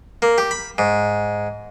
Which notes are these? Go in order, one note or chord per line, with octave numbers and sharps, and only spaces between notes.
A#3
G4
B5
G#2